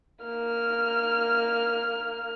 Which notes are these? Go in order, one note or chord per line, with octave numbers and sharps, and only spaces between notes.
A#3 F6